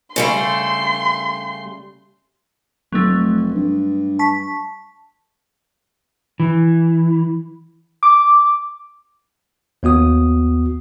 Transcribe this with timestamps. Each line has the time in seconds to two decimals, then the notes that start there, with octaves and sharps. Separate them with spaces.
0.16 C#3 G3 A3 C6
2.92 F1 F#3 A3
3.55 G2
4.19 A5 C#6 B6
6.40 E3
8.03 D6
9.83 D#2 B3 F#4 D#6